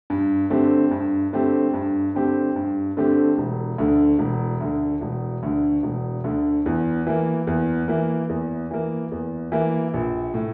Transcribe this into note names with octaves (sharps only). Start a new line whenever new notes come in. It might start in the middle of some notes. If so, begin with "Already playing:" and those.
G2
D3 A3 C4 G4
G2
D3 A3 C4 G4
G2
D3 A3 C4 G4
G2
D3 A3 C4 G4
E1
D2 D3
E1
D2 D3
E1
D2 D3
E1
D2 D3
E2
E3 A#3
E2
E3 A#3
E2
E3 A#3
E2
E3 A#3
A#1
A2